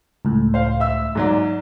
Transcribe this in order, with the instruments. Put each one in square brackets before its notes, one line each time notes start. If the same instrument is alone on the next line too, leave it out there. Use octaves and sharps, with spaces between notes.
[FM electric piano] C#2 A2
[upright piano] C5 F5
E5 E6
G#2 F#3 D5